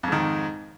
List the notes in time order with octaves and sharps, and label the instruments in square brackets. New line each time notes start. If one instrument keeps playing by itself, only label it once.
[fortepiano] F2
G#2
D#3